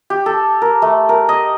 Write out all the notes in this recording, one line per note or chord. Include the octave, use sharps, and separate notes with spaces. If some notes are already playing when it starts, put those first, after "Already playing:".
G4
A4
A#4
A3
A#4
D#5